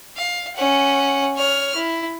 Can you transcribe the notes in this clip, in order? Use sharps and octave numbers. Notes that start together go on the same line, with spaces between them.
F5
C#4 F#5
C#5 F6
E4